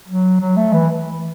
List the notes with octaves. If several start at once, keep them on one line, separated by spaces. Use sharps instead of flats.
F#3
F#3
A3
E3